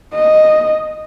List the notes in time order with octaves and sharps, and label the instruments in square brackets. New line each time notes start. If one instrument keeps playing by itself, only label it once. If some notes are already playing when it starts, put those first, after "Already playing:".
[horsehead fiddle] D#5